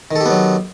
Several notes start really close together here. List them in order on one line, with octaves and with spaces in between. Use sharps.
D#3 A4 G4 B3 F#3